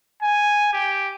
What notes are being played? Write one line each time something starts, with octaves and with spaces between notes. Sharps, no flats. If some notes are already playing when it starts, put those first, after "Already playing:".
G#5
G4